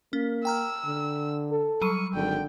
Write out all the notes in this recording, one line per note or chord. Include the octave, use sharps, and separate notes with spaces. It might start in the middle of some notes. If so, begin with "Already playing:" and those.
A#3 C#4
G5 A#5 E6 F6
D3
A4
F#3 G3 C#6 D#7
G#1 D3 G5